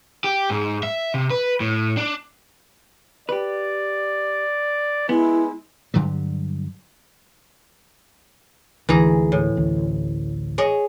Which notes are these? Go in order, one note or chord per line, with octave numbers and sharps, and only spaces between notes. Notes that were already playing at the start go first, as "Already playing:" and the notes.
G4
G#2
E5
C3
B4
A2
D4
G4 B4 D5
G#3 B3 E4
G2 D3 F#3 G3
D2 G#2 E3 G#4 A#5
A2
A1 D2
G#4 C#5 D#5